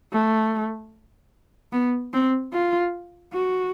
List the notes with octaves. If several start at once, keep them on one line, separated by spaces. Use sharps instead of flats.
A3
B3
C4
F4
F#4